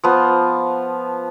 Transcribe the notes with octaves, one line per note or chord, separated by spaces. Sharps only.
F3 B3